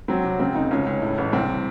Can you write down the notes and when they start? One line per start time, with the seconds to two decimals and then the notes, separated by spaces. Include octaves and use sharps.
0.08 F#3 C4
0.25 C3
0.39 C#3 C4
0.55 F1 D#4
0.71 C#2 C#4
0.87 C#2
1.02 A2
1.18 A1
1.32 C2 C4